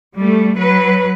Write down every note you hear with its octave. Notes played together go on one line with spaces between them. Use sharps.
G3 A3
F#3 B4